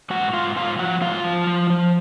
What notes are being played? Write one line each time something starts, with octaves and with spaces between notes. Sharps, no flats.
G#2 F#4 F#5
G#2 F4 F5
G#2 F4 F5
F3 F#4 F#5
G#2 F4 F5
F3
F3
F3